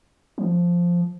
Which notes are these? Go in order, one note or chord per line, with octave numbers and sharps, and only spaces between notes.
F3